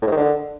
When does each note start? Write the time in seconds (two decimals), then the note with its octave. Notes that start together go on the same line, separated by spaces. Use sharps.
0.02 A2
0.07 G#2
0.12 D#3
0.17 D3